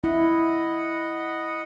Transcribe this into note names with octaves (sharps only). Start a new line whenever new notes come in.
E4 D#5 F#5 B5